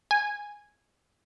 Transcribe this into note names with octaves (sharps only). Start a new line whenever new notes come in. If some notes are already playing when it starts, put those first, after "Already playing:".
G#5